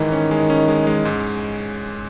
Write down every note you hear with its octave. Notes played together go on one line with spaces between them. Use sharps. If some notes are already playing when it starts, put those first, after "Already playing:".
Already playing: G#2 D#3 E3
C#4
G#3
C#4
G#3
G#3
G#2